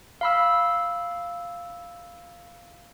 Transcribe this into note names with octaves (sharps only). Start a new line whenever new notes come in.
F5 B5 E6